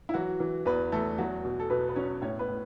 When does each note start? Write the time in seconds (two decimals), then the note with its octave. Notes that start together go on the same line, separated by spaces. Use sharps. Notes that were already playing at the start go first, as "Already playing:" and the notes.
0.09 E4
0.14 E3 F#3 F#4
0.40 E3
0.66 E2 B3 B4
0.92 E2 A3 A4
1.18 E2 F#3 F#4
1.45 B2
1.60 A4
1.70 B2 B3 B4
1.89 B4
1.96 F#3 C#4 C#5
2.22 A2 C#4 C#5
2.39 B3 B4
2.48 A2